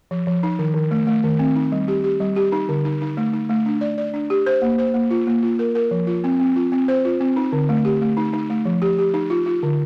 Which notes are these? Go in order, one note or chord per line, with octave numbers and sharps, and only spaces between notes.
F3
F3
D#4
D#3
D#3
A3
A3
D#3
C4
D#4
G3
G4
G4
G3
G4
D#4
D3
D#4
D#4
A3
D#4
A3
D4
D5
D5
D4
G4
C5
A#3
C5
A#3
F4
A#3
F4
A#4
A#4
F3
F4
C4
C4
F4
C4
C5
F4
C4
D#4
D3
A3
G4
A3
D#4
D#4
A3
F3
G4
G4
D#4
F4
F4
D3